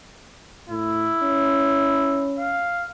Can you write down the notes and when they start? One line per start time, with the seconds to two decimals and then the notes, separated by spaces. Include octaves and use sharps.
0.69 A2 E4
1.23 C#4
2.38 F5